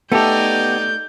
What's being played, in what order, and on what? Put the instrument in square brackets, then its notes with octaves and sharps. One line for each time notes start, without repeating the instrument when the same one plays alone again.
[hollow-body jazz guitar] A3 A4 [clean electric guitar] B3 G4 [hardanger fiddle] D#4 D5 [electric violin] G6